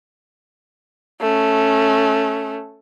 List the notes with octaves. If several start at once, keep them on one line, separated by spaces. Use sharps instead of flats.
A3 C#4